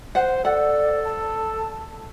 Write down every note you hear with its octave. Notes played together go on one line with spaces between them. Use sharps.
C5 F#5
A4 D5 F#5
A5